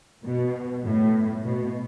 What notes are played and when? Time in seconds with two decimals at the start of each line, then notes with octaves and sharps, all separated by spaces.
0.25 B2
0.85 A2
1.45 B2